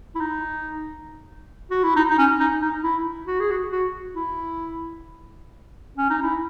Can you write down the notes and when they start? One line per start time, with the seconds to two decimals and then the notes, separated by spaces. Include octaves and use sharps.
0.15 E4
0.21 D#4
1.71 F#4
1.84 E4
1.96 D#4
2.10 D#4
2.18 C#4
2.40 D#4
2.62 D#4
2.83 E4
3.27 F#4
3.40 G#4
3.51 F#4
3.72 F#4
4.16 E4
5.97 C#4
6.10 D#4
6.22 E4